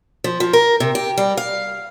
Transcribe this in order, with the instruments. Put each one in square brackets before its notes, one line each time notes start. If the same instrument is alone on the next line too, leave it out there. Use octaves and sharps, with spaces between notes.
[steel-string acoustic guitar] F3
F3
A#4
C3
G4
G3
F5